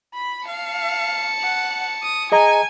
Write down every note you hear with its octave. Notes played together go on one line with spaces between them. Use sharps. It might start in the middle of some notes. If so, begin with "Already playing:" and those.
B5
F5 A5 C#7
F#5
D#6
G#4 D#5 G#5 A#5